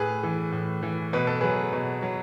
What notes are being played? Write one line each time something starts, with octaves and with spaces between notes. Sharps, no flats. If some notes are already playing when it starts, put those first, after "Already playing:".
Already playing: A2 G#4 B4
E3
A2
E3
B2 B4
A4
F#3 G#4 B4
B2
F#3